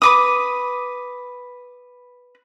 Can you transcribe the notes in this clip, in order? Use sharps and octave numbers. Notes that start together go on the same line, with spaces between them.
B4 D6 D#6